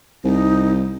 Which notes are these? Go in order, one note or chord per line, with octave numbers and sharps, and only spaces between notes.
C2 D#4